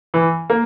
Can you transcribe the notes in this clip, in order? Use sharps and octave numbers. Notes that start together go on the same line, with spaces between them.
E3
A#3